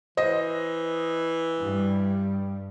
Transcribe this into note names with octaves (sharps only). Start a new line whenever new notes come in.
E3 C5 D#5
G2 G3